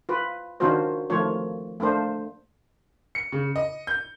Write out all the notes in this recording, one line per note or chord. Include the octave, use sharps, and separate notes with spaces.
F4 B4
D#3 C#4 D4 F4 F#4 C5
D#3 F3 A3 A#3 F4 C#5
A3 A#3 D4 C5
C#7
C#3
D#5
G6